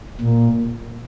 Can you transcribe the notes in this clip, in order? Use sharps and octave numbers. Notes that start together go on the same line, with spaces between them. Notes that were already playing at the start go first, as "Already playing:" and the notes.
A#2